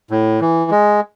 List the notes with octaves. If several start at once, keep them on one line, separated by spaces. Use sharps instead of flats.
A2
E3
G#3